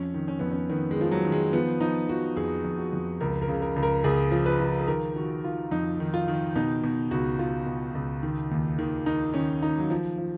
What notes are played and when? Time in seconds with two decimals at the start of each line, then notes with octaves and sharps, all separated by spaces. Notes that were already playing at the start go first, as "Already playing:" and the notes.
Already playing: F2 C#4
0.14 D#3
0.28 C#4
0.39 F2 B3
0.51 C#4
0.69 D#3 B3
0.91 G#3
0.97 D#3 F3
1.11 F#3
1.25 D#3
1.32 G#3
1.53 F3 B3
1.80 F3 D#4
2.09 F3 F#4
2.37 F2 G#4
2.65 F2
2.78 F#4
2.93 F2
3.21 C#2 A#4
3.42 A#4
3.48 C#3
3.62 A#4
3.76 C#2
3.83 A#4
4.04 C#2 G#4
4.32 F3
4.46 B4
4.60 F3
4.79 G#4
4.88 D#3 A#4
5.16 D#3 F#4
5.44 D#3 F4
5.71 F2 D#4
6.00 D#3
6.14 F4
6.28 D#3
6.56 B2 D#4
6.84 B2
7.11 C#2 F#4
7.38 B2 F4
7.66 B2
7.95 C#2
8.23 D#3
8.51 D#2
8.79 D#3
9.06 D#3 D#4
9.34 D#3 C#4
9.63 D#3 D#4
9.78 F#3
9.90 F3
10.18 F3